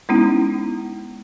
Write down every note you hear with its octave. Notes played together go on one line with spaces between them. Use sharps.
G#3 B3 C#4 D#4 E4